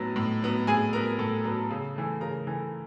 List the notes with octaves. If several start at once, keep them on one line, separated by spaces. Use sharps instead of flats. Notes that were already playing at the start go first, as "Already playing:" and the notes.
Already playing: A2 F#3 B3 D#4 D#5
A2
F#3 B3
A2 G#4 G#5
F#3 B3 A#4 A#5
A2 A4 A5
F#3 B3
C#3
E3 A3
C#3 A#4 A#5
E3 A3